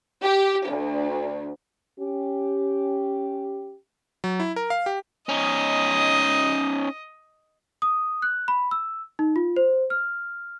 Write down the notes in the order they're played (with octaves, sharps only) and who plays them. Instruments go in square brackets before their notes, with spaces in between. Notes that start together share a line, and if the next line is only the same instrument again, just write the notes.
[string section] G4
D2
[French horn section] C#4 G4
[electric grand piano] F#3
E4
A#4
F5
G4
[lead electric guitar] C#4 D#4 [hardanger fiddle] D#5
[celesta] D#6
F#6
B5
E6
D#4
F4
C5
F6